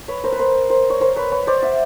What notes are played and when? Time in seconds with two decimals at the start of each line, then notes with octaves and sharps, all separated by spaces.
0.08 B4 C#5
0.24 A#4 C5
0.32 B4
0.39 A#4 C5
0.70 A#4 C5
0.90 C#5
1.01 A#4 C5
1.16 B4 C#5
1.32 B4 C#5
1.47 C5 D5
1.62 E5 F#5